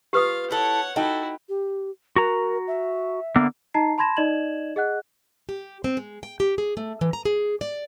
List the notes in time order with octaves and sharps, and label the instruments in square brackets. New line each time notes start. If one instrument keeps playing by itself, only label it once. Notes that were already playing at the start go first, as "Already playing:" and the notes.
[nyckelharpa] F4 F5 [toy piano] G4 B4 D#6
[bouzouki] E4 A4 [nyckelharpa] C#5 F#5
[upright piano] D#4 G5 [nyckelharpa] E4 F#4 [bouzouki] A4
[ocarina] G4
[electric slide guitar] F#4 A#5 [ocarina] A#4
[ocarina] E5
[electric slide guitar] D3 A#3 B3
[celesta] D#4 D#5 A5 A#5 C7
A5 B5 C6 G#6 A#6 E7
D#4 D5 D#5 G#6 E7 F#7
G#4 D#5 F#5 F#6
[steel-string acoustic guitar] G4
C4
G#3
G5
G4
G#4
A3
E3
A#5
G#4
D5